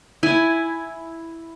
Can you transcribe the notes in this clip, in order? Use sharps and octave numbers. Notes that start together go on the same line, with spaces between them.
E4 G#5